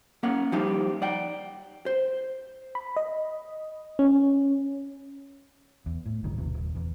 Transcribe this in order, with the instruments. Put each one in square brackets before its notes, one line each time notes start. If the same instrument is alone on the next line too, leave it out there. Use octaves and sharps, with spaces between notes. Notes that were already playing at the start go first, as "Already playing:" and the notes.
[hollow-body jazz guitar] A#3 C#4 F5 F#5
F3 G3 D#4 F4 G4
D5 F#5 G5
C5
[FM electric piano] B5
D#5
C#4
[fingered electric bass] E2
A2
G1 C#2 G2 D#3
A#1 E2 C3
D#1
E2